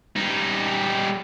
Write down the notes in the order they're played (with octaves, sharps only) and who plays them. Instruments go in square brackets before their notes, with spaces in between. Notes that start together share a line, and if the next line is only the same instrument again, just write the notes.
[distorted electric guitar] G3 D#4